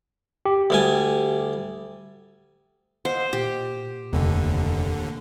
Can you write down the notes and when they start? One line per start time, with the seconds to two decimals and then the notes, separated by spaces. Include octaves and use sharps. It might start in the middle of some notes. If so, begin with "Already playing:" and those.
0.46 G4
0.70 D2 G3 G#5
3.05 C5 D#5 F5 F#5
3.33 A#2 G4
4.13 F1 D#2 D3